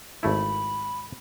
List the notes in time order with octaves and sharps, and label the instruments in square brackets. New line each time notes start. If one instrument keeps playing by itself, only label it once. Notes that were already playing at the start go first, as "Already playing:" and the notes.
[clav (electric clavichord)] G#1 A3 E4 [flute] B5